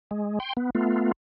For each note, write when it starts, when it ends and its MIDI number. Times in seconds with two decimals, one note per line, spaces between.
0.11 0.39 56
0.40 0.53 79
0.40 0.53 84
0.57 0.70 59
0.75 1.12 57
0.75 1.12 59
0.75 1.12 65